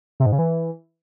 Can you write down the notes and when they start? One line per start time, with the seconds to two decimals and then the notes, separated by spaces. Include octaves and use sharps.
0.20 C3
0.26 G#2
0.32 C#3
0.39 E3